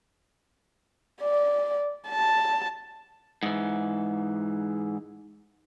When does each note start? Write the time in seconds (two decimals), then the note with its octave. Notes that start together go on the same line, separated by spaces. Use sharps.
1.22 D5
2.09 A5
3.43 G#2 E3